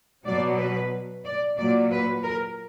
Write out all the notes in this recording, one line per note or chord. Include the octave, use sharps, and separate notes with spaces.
B2 F#3 D5
B4
D5
A#2 F#3 D5
B4
A#4